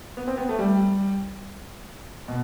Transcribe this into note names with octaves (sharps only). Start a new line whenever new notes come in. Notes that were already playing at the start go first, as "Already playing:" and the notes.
B3
C4
B3
A3
G3
B2